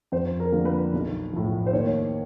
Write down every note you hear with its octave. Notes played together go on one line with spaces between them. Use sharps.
F2 C5
A#4
D3 F3 A#3
B4
B1
A2 F3
C5
D#2 C#5